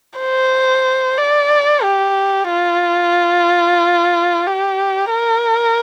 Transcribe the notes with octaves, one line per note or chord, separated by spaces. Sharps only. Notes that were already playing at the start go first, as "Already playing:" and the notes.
C5
D5
G4
F4
G4
A#4